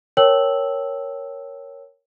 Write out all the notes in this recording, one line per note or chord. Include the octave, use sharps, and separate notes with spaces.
A#4 C#5 G5 A5 E6 F#7